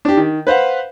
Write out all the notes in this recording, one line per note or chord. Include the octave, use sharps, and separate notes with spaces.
D4 G4
D#3
B4 C5 F5 F#5